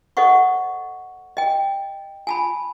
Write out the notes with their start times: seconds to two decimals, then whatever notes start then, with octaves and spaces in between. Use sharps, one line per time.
0.17 A4 C5 D#5 F#5 C#6
1.37 D#5 G5
2.27 G#5 A5 B5